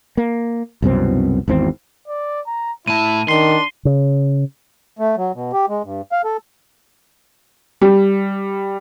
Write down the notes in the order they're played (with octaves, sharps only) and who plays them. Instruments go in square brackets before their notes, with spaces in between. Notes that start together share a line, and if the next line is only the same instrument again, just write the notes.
[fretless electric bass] A#3
C2 F#2 B2 C4
G#1 E2 C4
[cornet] D5
A#5
[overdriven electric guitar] A2 A5 [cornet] E4 [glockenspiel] D#7
[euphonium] D#3 [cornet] D4 [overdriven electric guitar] C6 [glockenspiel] C7 G7
[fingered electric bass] C#3
[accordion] A3
F#3
B2
G4
G#3
G2
F5
A4
[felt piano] G3